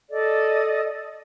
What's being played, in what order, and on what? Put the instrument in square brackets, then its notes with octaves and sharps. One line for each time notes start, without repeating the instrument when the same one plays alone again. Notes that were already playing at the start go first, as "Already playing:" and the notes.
[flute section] A4 D5 D#5